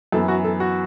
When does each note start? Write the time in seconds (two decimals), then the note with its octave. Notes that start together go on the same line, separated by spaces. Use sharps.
0.12 F#2 E3 B3 A4
0.28 F#4
0.44 A4
0.60 F#4